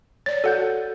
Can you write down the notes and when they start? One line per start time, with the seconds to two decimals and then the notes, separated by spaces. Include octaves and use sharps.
0.26 C#5 D5 A6
0.44 F#4 A4 F#5 G6